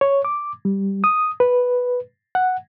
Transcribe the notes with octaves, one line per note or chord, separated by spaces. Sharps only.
C#5
D6
G3
D#6
B4
F#5